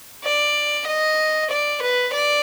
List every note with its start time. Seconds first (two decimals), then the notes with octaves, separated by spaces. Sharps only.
0.24 D5
0.87 D#5
1.50 D5
1.82 B4
2.13 D5